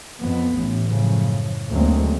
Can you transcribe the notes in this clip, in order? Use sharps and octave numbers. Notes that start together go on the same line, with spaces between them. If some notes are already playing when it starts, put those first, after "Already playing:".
F2 B3
A1
F#2 A2 C#3 F3
D2 C#3 F#3 G#3 A#3 C4